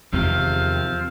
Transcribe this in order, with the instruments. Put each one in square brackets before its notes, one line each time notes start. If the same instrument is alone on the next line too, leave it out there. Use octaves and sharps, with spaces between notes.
[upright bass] E2 [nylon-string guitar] C3 D#3 G4 [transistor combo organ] F3 C4 [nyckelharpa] F5